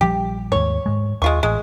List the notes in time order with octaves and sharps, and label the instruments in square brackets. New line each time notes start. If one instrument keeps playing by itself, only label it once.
[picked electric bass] A#1 F3 G3 [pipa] G4
[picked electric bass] D#2 G#2 [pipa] C#5
[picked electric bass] G#2 G#3
[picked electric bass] D#2 [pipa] G#3 F4 C#6
[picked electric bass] A1 [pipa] G#3